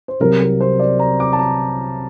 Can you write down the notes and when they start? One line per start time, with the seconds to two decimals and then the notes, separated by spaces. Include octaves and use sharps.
0.08 C5
0.20 C2 C3 F#3 C4 A#4
0.40 A#4
0.61 C5
0.79 D5
0.99 A#5
1.20 D6
1.33 A5
1.39 A#5